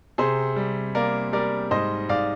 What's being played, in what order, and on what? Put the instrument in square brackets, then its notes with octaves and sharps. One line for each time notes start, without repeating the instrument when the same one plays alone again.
[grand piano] C3 G#4 C5
G3
A#3 A#4 D5
G3 A#4 D5
G#2 C5 D#5
G#2 D5 F5